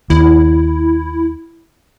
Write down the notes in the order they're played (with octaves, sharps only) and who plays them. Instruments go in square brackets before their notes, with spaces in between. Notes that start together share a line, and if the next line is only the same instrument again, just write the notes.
[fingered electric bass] D#2 [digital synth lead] E4